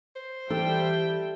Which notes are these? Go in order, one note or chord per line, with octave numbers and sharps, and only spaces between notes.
C5
E3 G3 G4 A4 E5 G5